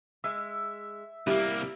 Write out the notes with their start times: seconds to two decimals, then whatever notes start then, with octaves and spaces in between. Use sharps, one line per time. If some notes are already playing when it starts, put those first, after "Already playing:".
0.24 G#3 E5
1.27 C2 G3 A#3 E4